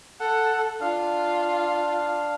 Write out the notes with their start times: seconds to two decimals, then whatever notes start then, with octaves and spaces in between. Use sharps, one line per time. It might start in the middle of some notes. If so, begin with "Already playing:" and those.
0.20 A4 F#5
0.80 D4 F4 F5